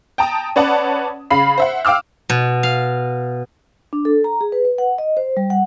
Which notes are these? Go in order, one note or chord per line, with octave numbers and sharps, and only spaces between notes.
G5 A5 A#5 D#6
C#4 B4 D5 F#5 A5
C#3 F5 B5 C7
C5 E5 F#5
F5 G5 D6 E6 F6
B2
F5
D4
A4
A#5
G#4
B4
B4
F#5
D#5
C5
G3
F#5